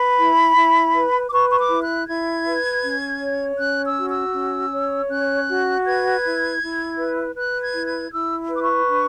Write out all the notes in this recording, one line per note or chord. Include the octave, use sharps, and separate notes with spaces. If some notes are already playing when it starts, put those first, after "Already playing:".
Already playing: B4 B5
E4
E4
B4
D6
B4 C#6
C#6
D6
E4
F#6
E4 G#6
B4
C#4
C#5
C#4 F#6
E6
F#4
E6
C#4
C#5
C#4 F#6
F#4
B4 G#6
E4
E4
B4
B4 F#6
G#6
E4
G#6
E4 E6
B4
D6
C#6
D4